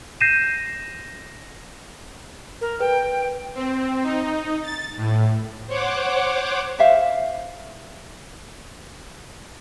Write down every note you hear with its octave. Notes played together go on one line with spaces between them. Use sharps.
G6 A#6 C7 D#7 E7
A#4
B4 G5
C4
D#4
A6
A2
C5 C#5 F#5 D6
C5 E5 F5